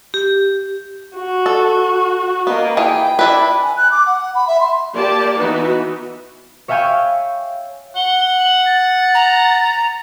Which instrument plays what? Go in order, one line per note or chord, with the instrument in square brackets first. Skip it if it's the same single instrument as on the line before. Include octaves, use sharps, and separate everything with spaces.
[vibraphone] G4
[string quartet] F#4
[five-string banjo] A4
[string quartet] A#3 D#5 [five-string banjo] B3
[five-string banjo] E3 G#4 [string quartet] G5
[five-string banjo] D4 E4 B4
[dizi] G#5
F#6
D6
F#5
B5
E5
C6
[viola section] A#3 G4 D5 A5
E3 B3 D#4 F#4 B4
[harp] C#5 E5 F5 G5 G#5 C#6
[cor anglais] F#5 [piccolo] G7
[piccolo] F#7
A6
[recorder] A#5